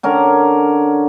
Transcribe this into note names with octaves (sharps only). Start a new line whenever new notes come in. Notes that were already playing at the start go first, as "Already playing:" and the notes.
D3 C#4 A#4